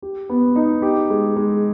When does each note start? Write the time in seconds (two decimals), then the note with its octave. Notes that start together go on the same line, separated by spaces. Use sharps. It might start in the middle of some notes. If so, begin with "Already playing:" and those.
0.02 G4
0.29 B3
0.56 D#4
0.82 G4
1.10 G#3
1.36 G#3